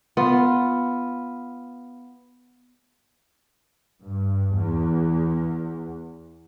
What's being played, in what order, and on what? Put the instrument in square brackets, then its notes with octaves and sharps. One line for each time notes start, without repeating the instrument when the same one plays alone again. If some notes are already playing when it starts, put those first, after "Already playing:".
[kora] B3 F4
[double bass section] G2
E2